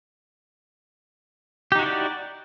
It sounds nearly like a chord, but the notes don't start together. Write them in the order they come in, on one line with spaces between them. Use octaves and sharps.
G4 D#4 F#4 E4 D5